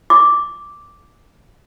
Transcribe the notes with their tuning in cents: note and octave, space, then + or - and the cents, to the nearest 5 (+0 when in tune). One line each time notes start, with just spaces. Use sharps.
D6 -5